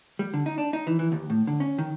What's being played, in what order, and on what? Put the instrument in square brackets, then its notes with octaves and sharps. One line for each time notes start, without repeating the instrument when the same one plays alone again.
[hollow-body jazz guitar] G3
D3
D#4
D4
D#4
E3
E3
D#2
A2
D3
C#4
D#3